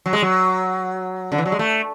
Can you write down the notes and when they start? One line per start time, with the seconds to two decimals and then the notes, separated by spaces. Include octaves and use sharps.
0.06 F#3
0.13 G#3
0.22 F#3
1.32 D3
1.38 E3
1.46 F#3
1.52 G#3
1.59 A3